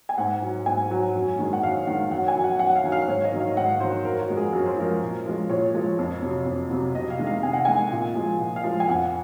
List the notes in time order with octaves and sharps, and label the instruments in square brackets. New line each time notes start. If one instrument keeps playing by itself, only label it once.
[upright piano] G#5
G#2 F#5
F#3
G#2 G#5
F#3
F#2
D#3 G#3
F#5
F#2 F5
D#3 G#3 F#5
F#2 F#5
G#5
D#3 F#3
F#5
F#2 F#5
F#5
F5
D#3 F#3
F5
G#2 C#5
D#5
D#3 F#3
F5
G#2 F#5
D#3 F#3 C5
F#2 A#4
F#4
F3 G#3
G#4
F#2 A#4
C5
F3 G#3 A#4
A#2
F3 G#3
A#2 C#5
F3 G#3
F2
C3 F#3
F2
C3 F#3
C3 D#5
F5
D#3 G#3
F5
C3 G#5
F#5
D#3 G#3 G#5
A#2
F3 G#3
A#2
F5
F3 G#3
G#5
F2 F#5